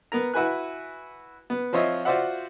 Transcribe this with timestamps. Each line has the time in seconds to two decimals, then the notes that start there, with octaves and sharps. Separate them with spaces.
0.12 B3 A#4 A#5
0.34 E4 F#4 B4 G#5 F#6
1.50 B3
1.73 F3 C4 F4 C#5 D#5 E5
2.05 F4 F#4 C5 D5 E5 F#5